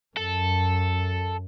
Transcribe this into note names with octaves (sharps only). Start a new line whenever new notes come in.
F#2 A4